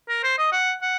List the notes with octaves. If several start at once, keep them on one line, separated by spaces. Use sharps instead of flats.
A#4
C5
D#5
F#5
F#5